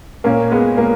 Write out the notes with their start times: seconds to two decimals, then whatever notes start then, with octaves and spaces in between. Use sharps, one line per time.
0.24 A#2 A#3 C#4
0.51 G#3 B3
0.77 A#3